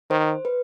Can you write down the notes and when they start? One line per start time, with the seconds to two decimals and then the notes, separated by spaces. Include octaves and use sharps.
0.10 D#3 C5
0.45 B4